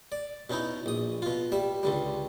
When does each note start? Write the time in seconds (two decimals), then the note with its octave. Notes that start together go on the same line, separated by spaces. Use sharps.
0.12 D5
0.50 B2 C#4 D#4 E4
0.86 A#1 D#6
1.22 B2 F4
1.52 G3 E5
1.83 C#2 D3 G3